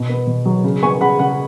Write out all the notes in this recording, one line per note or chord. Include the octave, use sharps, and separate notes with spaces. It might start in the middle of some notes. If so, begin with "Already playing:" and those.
Already playing: B2
B3
B2
F#3
C#3
B3 G#5 C#6
C#3 F#5 B5
C#3 F#5